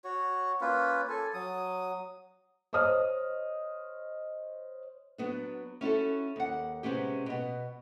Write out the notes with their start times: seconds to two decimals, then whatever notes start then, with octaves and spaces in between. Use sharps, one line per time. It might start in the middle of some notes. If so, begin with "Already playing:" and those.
0.04 F#4 C#5
0.61 A#3 C#4 F4 B4
1.09 A4 G#5
1.34 F#3 D#6
2.73 C5 C#5 D#5 D#6 F6
5.18 F#3 B3 D4
5.81 C#4 E4 F#4 A4
6.36 D#2 F#5
6.83 C3 G#3 B3 C#4 G4
7.26 B2 B3